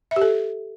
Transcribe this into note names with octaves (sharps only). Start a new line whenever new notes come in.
E5
G4
A4